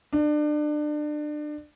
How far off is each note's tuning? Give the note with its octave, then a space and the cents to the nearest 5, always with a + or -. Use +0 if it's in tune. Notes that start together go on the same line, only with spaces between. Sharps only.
D4 +30